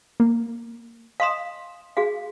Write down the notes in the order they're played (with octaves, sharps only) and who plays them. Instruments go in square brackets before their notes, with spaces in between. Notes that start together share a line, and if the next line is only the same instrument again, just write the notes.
[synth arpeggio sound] A#3
[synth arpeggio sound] D#5 E7 [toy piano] F5 C6 D#6
[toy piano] F#4 G#4 F5